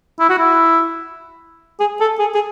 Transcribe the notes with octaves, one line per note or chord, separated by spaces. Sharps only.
E4
F#4
E4
G#4
A4
G#4
G#4